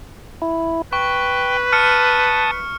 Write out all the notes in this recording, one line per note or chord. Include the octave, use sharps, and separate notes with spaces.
E4
B4 G5 C#6
A5 D#6 F6 C#7